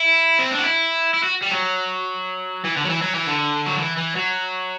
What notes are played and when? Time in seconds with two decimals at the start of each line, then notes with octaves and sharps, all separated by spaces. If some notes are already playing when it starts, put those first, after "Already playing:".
Already playing: E4
0.39 C4
0.51 D4
0.59 F#4
0.64 E4
1.14 E4
1.23 F#4
1.42 G3
1.51 F#3
2.64 E3
2.77 D3
2.85 F#3
2.90 E3
3.02 F#3
3.15 E3
3.27 D3
3.66 F#3
3.78 E3
3.97 E3
4.15 F#3